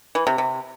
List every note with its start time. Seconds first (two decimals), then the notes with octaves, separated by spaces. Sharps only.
0.15 E3
0.27 C3
0.38 C3